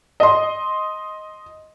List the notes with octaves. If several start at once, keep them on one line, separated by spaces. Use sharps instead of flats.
D#5 C6